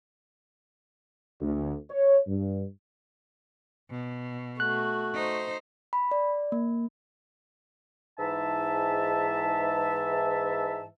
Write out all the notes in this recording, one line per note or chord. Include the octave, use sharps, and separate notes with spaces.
D2
C#5
G2
B2
A3 F#4 F#6
D#4 C5
B5
D5
A#3
G#2 E3 E5 A5